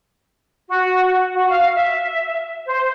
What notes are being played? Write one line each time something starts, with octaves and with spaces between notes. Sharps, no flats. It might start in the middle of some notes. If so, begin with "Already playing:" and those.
F#4
F#4
F5
E5
C5